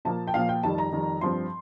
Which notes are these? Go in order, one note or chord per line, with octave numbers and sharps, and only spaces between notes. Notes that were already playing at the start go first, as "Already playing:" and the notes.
A#2 F3 A#3 A5
G5
A#2 F3 A#3 F5
G5
F2 D#3 G3 A5
A#5
F2 D#3 G3
G2 F3 C4 C6